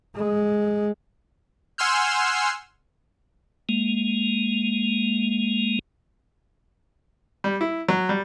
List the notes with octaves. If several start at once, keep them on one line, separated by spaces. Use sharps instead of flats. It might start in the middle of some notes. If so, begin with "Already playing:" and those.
G#3
F#5 G#5 C6 E6 F6 G6
G#3 A#3
G3
E4
F#3
G3